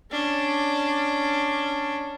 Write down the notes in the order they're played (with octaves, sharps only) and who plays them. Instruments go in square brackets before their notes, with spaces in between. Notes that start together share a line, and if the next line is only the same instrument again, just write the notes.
[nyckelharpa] C#4 D4